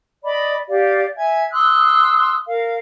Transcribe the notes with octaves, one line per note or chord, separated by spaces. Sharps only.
D5 D#5 B5 D6
G4 D5 F5
E5 G#5 G#6
C6 D#6 E6 F#6
A#4 F5